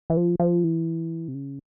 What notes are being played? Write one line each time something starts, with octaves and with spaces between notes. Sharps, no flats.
E3
F3
F3
E3
C3
C#3